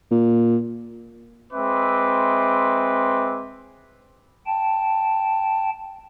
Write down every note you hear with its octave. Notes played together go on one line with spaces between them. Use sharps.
A#2
G#3 C4 B4 E5 C6 D6
G5 A5